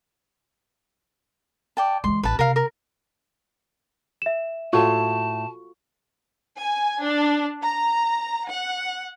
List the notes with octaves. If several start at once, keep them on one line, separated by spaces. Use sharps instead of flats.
D5 G5 A5
E3 G#3 C6
A1 B4 A5
C3 A#4 F5
A#4
E5 E7
A2 F4 F#4 A4 A5 C#6
G#5
D4
A#5
F#5